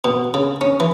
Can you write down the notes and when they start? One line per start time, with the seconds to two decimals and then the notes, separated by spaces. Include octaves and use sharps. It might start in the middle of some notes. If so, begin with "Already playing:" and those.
0.04 B2
0.34 C#3
0.61 C#4
0.80 E3